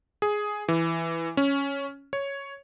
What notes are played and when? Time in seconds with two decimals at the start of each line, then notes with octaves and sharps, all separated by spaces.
0.22 G#4
0.68 E3
1.37 C#4
2.13 C#5